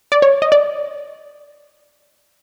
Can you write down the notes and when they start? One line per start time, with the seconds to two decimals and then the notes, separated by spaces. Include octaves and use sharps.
0.12 D5
0.22 C#5
0.42 D#5
0.52 D5